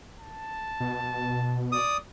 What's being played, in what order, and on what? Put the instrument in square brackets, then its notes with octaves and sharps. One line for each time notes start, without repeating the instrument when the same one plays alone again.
[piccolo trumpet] A5
[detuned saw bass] B2
[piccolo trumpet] D5 [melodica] D#6